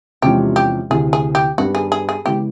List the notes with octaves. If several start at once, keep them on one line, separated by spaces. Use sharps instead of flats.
E2 C3 F3 G#3 C#4 G4
G4
D2 C3 E3 G#4
G#4
G4
G2 D#3 G3 B3 D4 F#4
G#4
G#4
G#4
C#3 E3 G#3 B3 G4